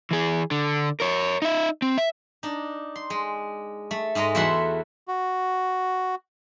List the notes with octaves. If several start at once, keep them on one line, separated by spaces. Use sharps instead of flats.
E3 G#4
D3
A#4 C#5
D#4 E5
C4
E5
D4 D#4
C6
G#3
A3
G#2 G#3 D#5 A#5
E2 A3 F#4 E5 F#5 C6
F#4